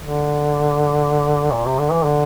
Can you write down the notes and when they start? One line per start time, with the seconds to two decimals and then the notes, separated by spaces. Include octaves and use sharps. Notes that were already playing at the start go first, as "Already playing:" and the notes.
0.02 D3
1.51 A#2
1.66 C3
1.79 D3
1.92 E3
2.05 D3